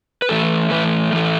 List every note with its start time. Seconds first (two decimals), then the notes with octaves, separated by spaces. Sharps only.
0.22 B4
0.29 A2 E3 A3 A4
0.70 A2 E3 A3 B4
1.12 A2 E3 A3